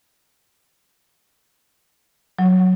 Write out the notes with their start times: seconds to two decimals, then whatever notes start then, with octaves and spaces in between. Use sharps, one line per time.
2.39 F#3